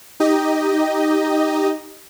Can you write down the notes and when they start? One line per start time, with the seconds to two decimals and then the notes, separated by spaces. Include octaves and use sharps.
0.20 D#4 G4 D#5